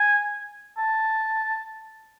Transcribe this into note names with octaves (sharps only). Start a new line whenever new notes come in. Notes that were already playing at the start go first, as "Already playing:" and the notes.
Already playing: G#5
A5